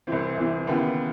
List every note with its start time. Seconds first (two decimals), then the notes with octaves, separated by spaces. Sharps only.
0.07 C2 C3 E3 C4
0.37 C2 C3 E3
0.67 D#2 C#3 E3 B3